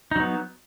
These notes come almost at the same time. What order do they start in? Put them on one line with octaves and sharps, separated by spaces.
D#4 F#3 B3